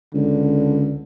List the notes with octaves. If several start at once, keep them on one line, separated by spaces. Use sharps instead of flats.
C#2 D3